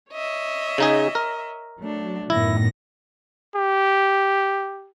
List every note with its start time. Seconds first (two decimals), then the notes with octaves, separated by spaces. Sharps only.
0.11 C#5 D#5 E5
0.78 C#3 D#4 G#4
1.15 A#4
1.80 F#3 A3 D4
2.30 F#2 A2 D#3 B3 E4 A#6
3.56 G4